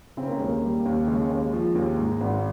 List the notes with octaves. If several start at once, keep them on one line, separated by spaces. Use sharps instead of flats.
C#3 C4
A#3
D#2 G#3
A#3
G3
D#2
C#3 G#3
D#2
F3
D#2
G#2
G#1